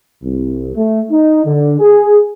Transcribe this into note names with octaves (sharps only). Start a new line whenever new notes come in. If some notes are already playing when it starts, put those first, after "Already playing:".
C2
A3
D#4
D3
G#4